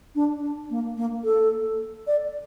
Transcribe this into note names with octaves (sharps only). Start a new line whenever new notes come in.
D4
D4
A#3
A#3
A4
D5